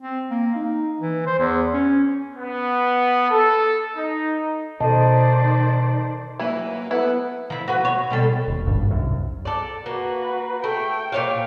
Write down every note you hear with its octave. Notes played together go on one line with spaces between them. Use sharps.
C4
A#3
D#4
E3
C5
E2
C#4
B3
A4
D#4
B2 D#3 A4 C5 D5 D#5 A5
E3 F#3 A#3 E4 B4
B3 E4 A4 B4 F#5
F3 E4
F#4 B4
C#5
B2 G3 A4
D#1
G#1 G2
C2 F#2
A4 D5
A#3 F#4 B4
A3 G5
A#2 C#5 F5